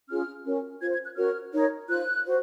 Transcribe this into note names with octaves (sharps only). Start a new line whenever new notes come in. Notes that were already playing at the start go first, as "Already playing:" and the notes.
C#4 F4 G#4 F6
C#4 F#4 A#4 C#5
F4 C5 G#6
G#6
F#6
C#4 F#4 A#4 C#5 F6
D#4 A#4 C#5
F4 C5 F#6
F#4 C5